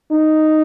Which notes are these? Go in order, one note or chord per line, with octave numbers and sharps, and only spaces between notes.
D#4